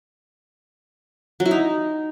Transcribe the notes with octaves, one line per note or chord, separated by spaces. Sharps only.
F#3
E4
D#4